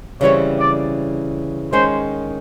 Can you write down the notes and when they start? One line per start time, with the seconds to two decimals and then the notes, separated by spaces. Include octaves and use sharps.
0.21 C#3 E3 G3 C4 C#5
0.59 D5
1.72 D#3 G#3 C#4 C5